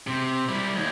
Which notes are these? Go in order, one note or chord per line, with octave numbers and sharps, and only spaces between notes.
C3
G3 E4
D#2